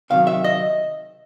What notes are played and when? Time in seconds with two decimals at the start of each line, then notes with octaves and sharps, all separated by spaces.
0.10 C3 D#3 F#3 C4 F5
0.27 E5
0.44 D#5